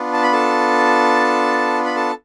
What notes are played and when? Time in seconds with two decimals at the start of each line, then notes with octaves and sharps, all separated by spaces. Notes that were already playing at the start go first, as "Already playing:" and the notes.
Already playing: B3 D4 F4
0.13 A5
0.23 B5
0.33 A4 A5
1.85 B5
1.96 A4 A5